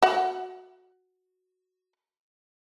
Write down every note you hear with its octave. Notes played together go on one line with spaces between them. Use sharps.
F#4 F#5